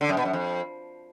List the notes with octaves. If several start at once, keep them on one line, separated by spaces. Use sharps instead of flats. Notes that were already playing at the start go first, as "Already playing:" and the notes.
D3
F#2
B2
F#2
F2